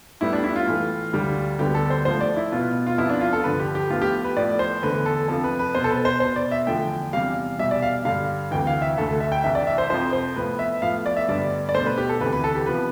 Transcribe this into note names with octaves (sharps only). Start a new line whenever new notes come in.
A2 G3 B3 E4
D4
E4
F4
A2 E3 A3
D2 D3 G3
D2 D3 G3 B3 G4
A4
C5
A2 F3 A3 C5
D5
E4
B2 B3 F4
F4
C2 C3 F3 B3 E4
D4
F4
A4
G2 D3 F3 B4
G4
G4
A2 F3 B3 F4
G4
B4
A2 F3 B3 D5
C5
E2 D3 A3 B4
A4
F2 C3 F3 A4
B4
B4
B2 B3 C5
A4
B4
C5
B2 B3 C5
D5
E5
E2 D3 F3 A3 G5
E2 C3 G3 F5
E2 B2 G3 E5
D5
F5
G2 D3 G3 F5
D2 C3 E3 G5
F5
E5
D2 D3 A3 A4
A4
E5
G5
C2 C3 E3 E5
D5
E5
C5
F2 C3 F3 C5
C5
A2 F3 B3 B4
E5
A2 F3 B3 F5
D5
E5
G2 D3 G3 B3 D5
D5
B2 A3 C5
B4
G4
A4
D2 C3 E3 B4
B4
A4
G4
C3 F3 B3 B4